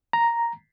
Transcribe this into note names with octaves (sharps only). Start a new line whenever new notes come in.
A#5